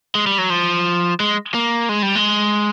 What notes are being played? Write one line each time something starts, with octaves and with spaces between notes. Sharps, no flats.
G#3
G3
F#3
F3
G#3
A#3
G#3
G3
G#3